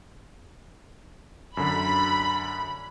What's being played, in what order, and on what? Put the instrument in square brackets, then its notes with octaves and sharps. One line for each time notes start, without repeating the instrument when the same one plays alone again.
[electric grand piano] F#2 D3 [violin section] B5